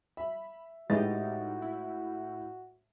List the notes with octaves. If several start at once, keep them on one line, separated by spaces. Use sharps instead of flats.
E5 B5
A2 G#3 D#4 F#4 G4 B4 D#5 A6
E4